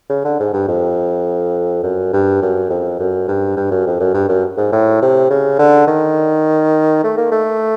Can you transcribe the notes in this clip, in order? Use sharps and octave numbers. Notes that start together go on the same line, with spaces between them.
C#3
D3
G#2
G2
F2
F#2
G2
F#2
F2
F#2
G2
G2
F#2
F2
F#2
G2
F#2
G#2
A2
C3
C#3
D3
D#3
A3
A#3
A3